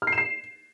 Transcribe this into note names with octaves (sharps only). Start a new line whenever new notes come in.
F6
C7
E7
C7